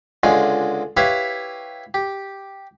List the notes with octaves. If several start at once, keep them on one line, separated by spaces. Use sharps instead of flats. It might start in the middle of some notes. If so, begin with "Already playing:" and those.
C#2 D3 G#3 F4
E4 G4 B4 C#5 E5 F5
G4